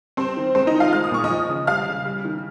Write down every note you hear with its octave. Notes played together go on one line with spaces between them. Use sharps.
G3 C4 C5
D#3
G#3 C4 C5
D#4 D#5
D#3
F4 F5
G#3 F6
D#6
A#2 C#6
D#5 D#6
F3
C#3
G3 F5 F6
C#3
G3
D#3